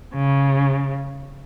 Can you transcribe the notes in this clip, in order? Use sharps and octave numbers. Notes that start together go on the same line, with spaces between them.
C#3